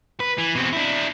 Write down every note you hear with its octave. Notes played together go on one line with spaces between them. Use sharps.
B4
E3
B2 C4
D4 E4